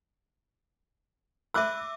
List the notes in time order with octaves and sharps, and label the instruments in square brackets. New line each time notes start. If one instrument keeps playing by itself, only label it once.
[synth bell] E5 D6 E6 [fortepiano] B5 F#6